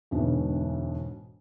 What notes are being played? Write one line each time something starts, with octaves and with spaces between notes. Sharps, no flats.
E1 D2 G#2 B2